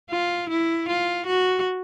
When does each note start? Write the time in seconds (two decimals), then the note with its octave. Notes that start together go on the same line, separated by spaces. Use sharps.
0.11 F4
0.49 E4
0.89 F4
1.27 F#4